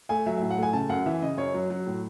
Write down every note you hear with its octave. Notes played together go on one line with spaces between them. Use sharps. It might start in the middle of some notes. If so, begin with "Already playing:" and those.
A3 G#5
F#3 E5
A2 E5
F#5
A3 G#5
C#3 A5
F#2 F#5
E3 E5
C#3 D#5
F#2 C#5
F#3
F#3
A2